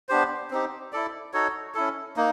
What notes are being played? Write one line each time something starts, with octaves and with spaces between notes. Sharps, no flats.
B3 D4 G4 C5
C4 D#4 G4
E4 A4 D5
D#4 F#4 A4 C#5
C#4 E4 A4
A#3 D#4